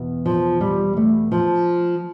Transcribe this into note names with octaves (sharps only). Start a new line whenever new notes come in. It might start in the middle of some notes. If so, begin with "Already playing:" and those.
Already playing: E2 B2
F3
G3
A3
F3